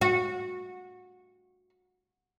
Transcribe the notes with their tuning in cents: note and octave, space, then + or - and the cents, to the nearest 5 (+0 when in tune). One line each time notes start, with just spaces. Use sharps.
F#4 -20